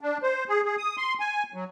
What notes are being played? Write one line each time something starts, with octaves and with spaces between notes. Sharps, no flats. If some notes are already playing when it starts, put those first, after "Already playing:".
D4
C5
G#4
G#4
D#6
C6
G#5
F#3